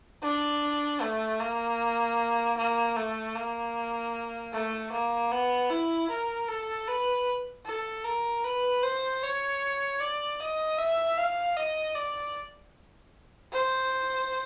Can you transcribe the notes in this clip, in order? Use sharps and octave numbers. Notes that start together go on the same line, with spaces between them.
D4
A3
A#3
A#3
A3
A#3
A3
A#3
B3
E4
A#4
A4
B4
A4
A#4
B4
C5
C#5
D5
D#5
E5
F5
D#5
D5
C5